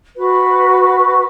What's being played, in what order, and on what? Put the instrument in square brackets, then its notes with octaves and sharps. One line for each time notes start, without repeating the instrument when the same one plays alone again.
[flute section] F#4 B4